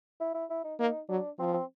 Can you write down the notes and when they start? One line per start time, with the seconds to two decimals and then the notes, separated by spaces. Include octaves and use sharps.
0.20 E4
0.34 E4
0.50 E4
0.64 D#4
0.80 A#3 D#4
1.09 F#3 D4
1.39 F3 C4
1.54 C4